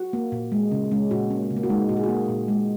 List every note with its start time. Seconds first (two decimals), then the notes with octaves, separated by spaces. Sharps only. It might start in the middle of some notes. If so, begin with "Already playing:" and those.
Already playing: F#4
0.13 A#3
0.32 A#2
0.52 G#3
0.71 C#3
0.91 G#3 C#4
1.11 A#2 F#4
1.30 A#3 C#4
1.43 C#4
1.50 C#3
1.57 A#3
1.63 F#4
1.69 G#3 D#4
1.89 A#2 F#4
1.97 G#4
2.04 F#4
2.09 A#3
2.28 A#2
2.48 G#3